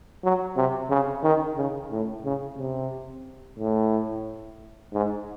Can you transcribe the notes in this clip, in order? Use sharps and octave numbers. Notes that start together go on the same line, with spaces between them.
F#3
C3
C#3
D#3
C#3
A2
C#3
C3
A2
G#2